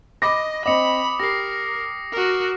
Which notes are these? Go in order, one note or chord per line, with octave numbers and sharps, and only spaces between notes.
D#5 B5 D6 A#6
C4 D#5 B5 D6 D#6 C#7
G4 A#4 A#6 C7
F#4 A#4